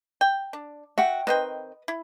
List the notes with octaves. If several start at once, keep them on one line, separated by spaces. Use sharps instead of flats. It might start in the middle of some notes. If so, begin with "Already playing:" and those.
G5
D4
F#4 E5 F#5 G5
D#3 C4 B4 D#5 G5
E4